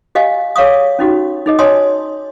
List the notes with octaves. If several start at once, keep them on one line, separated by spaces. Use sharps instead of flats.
G4 D#5 F5 G#5
G#4 C#5 F5 C#6 D#6
C#4 D#4 F#4 G4
D#4 G#4 D#5
C#5 D#5 G#5 A5 C6 D#6